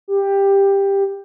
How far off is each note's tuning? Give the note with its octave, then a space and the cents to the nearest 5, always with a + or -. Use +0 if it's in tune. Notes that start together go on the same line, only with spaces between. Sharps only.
G4 +10